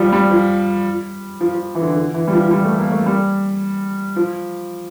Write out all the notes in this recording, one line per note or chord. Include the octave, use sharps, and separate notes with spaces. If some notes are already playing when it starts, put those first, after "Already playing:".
Already playing: F3 G3
G3
F3
F3
F3
E3
D3
D3
E3
G3
F3
F3
G3
A3
A#3
A3
G3
F3